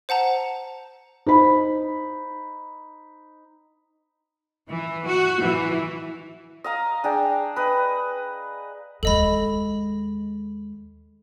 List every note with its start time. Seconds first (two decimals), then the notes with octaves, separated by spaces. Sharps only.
0.09 C5 F#5 A5 A#5
1.26 D#4 C5 B5
4.68 E3
5.05 F#4
5.41 E3
6.64 D#5 F5 A#5
7.04 D4 G#4 G5
7.56 B4 D#5
9.03 D#2 G#3 A4 D#5 B5